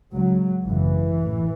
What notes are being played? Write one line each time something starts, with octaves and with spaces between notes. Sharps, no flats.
C#2 C#3 F#3
G#1 F#2 C#3 E3
A1 A2